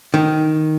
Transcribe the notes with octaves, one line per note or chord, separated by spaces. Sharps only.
D#3